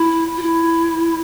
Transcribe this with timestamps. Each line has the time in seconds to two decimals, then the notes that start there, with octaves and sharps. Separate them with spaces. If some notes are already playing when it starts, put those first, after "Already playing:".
Already playing: E4
0.37 F4
0.42 E4